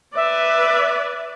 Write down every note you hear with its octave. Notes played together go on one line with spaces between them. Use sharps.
B4 D5 E5